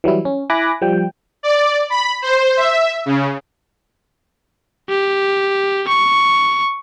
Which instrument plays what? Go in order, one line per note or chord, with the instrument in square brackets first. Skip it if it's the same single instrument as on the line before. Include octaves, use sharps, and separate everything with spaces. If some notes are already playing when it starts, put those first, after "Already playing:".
[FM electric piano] E3 F#3 G3 E4
C#4
E4 G#5 B5 D6 F#6 A#6
F3 G3 G5
[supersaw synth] D5
B5
C5
E5
C#3
[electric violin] G4
C#6